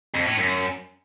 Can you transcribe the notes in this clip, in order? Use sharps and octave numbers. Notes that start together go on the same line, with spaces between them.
F2
A2
F#2